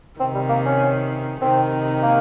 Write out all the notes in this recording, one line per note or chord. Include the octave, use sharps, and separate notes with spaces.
C3 D#3 C4
G3
A#3
C#4
C3 D#3 C4
A#3